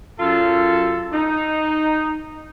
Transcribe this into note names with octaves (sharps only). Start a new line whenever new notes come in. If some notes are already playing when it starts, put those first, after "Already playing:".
F#2 F4 A4
D#4